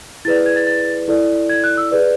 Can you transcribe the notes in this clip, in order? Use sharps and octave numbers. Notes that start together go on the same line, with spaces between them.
E4 G#4 B4 D5 A6
G#6
A6
A6
E4 A4 D5
G#6
F#6
E6
G#4 B4 D5